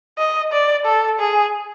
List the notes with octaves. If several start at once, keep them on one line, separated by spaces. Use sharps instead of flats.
D#5
D5
A4
G#4